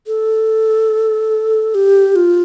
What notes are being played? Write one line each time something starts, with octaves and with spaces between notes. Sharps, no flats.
A4
G4
F4